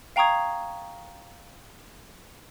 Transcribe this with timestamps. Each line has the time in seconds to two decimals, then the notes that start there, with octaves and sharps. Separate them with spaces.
0.16 F5 G5 A#5 C#6 D#6 G#6